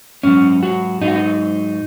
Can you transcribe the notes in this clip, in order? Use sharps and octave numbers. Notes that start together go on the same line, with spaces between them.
G#2 F#3 C#4
F#4
G#2 F#3 D#4
F#4
D#4